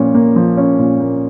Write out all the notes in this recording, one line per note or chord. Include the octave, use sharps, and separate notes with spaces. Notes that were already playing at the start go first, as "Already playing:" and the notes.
Already playing: A#2 F3 C#4
A#3
F3
C#4
A#2
A#3